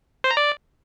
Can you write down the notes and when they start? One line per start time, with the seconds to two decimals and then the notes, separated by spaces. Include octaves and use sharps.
0.24 C5
0.31 A#5
0.37 D5